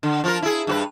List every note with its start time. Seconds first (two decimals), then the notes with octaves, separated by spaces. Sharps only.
0.03 D3
0.24 F3 F4 A#4
0.42 E4 G#4
0.67 G2 F#4 B4